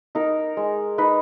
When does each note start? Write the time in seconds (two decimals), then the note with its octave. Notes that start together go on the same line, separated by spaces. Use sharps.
0.15 D#4 A#4
0.57 G#3
0.98 D#4 B4